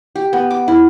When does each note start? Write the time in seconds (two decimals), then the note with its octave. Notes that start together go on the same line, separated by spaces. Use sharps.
0.16 G4
0.33 B3
0.50 D6
0.68 E4